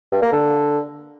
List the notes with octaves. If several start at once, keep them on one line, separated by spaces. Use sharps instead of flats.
G2
A#3
D3